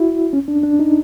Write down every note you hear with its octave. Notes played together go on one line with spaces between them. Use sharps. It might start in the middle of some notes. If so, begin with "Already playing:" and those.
Already playing: E4 F#4
C#4
D4
D4
D#4